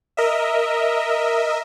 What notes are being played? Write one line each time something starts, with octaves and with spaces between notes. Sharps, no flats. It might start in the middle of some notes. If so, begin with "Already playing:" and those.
A#4 D#5 E5